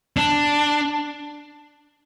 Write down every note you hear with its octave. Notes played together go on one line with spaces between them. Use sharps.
D4